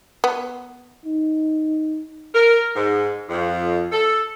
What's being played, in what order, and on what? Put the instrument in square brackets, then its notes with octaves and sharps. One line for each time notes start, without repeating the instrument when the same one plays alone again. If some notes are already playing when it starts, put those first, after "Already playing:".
[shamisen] B3
[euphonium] D#4
[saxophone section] A#4
G#2
F2
A4